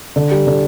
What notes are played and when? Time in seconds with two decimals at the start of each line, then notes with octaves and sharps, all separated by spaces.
0.16 D3
0.31 G3
0.47 D3